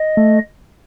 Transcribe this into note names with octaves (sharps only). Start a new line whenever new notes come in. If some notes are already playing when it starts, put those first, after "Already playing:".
Already playing: D#5
A3